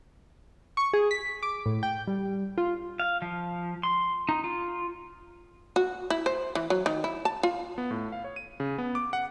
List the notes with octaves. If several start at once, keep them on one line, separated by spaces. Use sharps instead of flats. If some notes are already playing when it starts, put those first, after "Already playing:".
C#6
G#4
B6
D6
A2
G5
G3
F4
F5
F3
C6
D#4
F4
F#4
E4
C5
E3
F#3
D#3
E4
A5
F4
B3
A2
F5
C#5
D#7
C#3
B3
D6
F#5